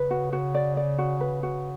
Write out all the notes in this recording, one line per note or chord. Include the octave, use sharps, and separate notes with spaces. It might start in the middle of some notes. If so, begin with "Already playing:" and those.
Already playing: C#3 B4
F#4
F#4
D5
D5
F#4
B4
F#4